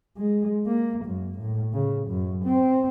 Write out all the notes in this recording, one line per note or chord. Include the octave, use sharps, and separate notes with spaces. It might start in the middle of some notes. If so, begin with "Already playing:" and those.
G#3
A#3
F#2
A2
C#3
F#2
C4